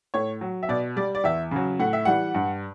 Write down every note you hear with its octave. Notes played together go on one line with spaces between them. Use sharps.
A2 C#5
F#3
E5
B2 D5
G3 D5
D5
E2 E5
C#3 F#3
A2 F#5
E5
E3 G3 F#5
G2